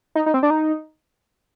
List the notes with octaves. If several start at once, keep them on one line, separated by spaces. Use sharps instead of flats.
D#4
D#4
C4
D4
D#4